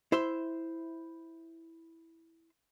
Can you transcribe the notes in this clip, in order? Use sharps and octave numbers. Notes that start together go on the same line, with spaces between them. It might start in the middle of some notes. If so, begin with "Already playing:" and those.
E4 C5 E5 C6